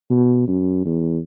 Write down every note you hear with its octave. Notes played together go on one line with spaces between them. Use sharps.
B2
F#2
E2